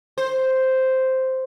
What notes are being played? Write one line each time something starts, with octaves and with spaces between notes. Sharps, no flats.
C5